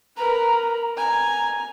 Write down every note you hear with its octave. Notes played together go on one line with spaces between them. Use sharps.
A#4 B4 A#5
G#5 A#5